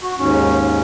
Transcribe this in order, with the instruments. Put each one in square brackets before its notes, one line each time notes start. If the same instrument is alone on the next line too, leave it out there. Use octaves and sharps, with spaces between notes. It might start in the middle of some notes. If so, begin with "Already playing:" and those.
[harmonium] F#4
D#2 G#2 C#4